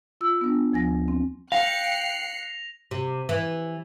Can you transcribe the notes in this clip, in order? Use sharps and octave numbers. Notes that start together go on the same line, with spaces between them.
F4 E6
B3 D4
D2 F3 G#5 A#6
C4
F5 G5 F#6 A#6 C7 C#7 F7
C3
E3